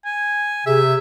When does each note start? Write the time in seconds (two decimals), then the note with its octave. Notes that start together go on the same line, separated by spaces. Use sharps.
0.05 G#5
0.66 C3 G#4 E5